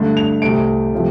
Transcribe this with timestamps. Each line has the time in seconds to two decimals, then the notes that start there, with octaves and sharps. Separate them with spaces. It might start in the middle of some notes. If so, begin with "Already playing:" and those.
Already playing: G2 D3 A3
0.17 F7
0.42 C2 C3 A3 D7
0.94 C3 F3 A3